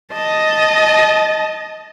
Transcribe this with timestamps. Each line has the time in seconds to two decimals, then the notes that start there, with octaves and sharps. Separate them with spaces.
0.13 D#5 A5